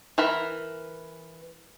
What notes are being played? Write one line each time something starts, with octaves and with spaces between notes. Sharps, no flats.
E3 A#4 B5